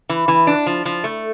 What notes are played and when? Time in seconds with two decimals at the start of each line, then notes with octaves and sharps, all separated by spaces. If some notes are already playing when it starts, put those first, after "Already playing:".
0.09 E3
0.28 E3
0.47 D4
0.66 F3
0.86 F3
1.04 A3